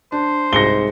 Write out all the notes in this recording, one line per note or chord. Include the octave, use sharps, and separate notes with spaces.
D4 C5
C2 G#2 A#6 C#7 G7